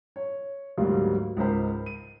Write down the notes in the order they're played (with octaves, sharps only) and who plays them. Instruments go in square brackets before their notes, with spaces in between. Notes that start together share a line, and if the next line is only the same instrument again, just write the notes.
[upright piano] C#5
D2 G#2 F#3 G3 A#3
C#2 G#2 A#4 C5 B5
D#7